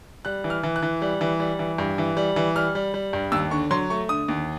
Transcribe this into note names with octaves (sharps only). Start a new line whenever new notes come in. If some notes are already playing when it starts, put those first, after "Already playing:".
G3 F#6
E3
F6
E3
F#6
E3
G3
E3
G3
E3
G2
E3
G3
E3
G3 F6
G3
G3
G2
D#2 E6
D3 C#6
F#3 C6
A3 C#6
D3 D#6
D#2